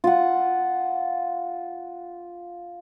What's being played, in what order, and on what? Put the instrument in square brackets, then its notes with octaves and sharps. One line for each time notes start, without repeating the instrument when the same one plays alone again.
[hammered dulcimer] F4 F#5